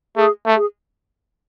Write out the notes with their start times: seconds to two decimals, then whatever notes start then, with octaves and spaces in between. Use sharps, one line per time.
0.17 A3 G#4
0.46 A3
0.56 G#4